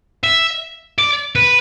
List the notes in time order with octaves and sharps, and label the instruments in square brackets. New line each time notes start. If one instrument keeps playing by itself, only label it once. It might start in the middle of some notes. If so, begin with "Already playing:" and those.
[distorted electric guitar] E5
D5
B4